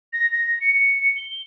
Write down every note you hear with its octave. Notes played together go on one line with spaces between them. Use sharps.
A#6
A#6
C#7
G7